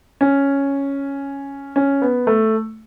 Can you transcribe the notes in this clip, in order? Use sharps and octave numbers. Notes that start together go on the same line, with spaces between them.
C#4
C#4
B3
A3